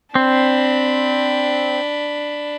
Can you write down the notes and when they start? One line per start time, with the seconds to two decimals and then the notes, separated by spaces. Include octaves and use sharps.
0.15 C4 D4 B5